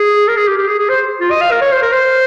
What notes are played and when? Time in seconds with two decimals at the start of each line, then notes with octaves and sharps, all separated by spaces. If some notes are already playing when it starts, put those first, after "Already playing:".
Already playing: G#4
0.28 A#4
0.36 G#4
0.47 G4
0.57 G4
0.68 G#4
0.78 G#4
0.89 C5
1.20 F4
1.30 D#5
1.41 F5
1.51 A#4
1.61 C#5
1.72 C5
1.82 A#4
1.92 C5